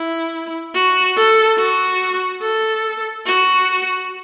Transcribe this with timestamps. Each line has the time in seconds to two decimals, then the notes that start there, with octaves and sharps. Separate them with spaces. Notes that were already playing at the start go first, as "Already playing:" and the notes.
Already playing: E4
0.75 F#4
1.16 A4
1.58 F#4
2.42 A4
3.26 F#4